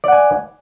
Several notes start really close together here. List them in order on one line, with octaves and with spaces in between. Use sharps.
D5 F#5 G#5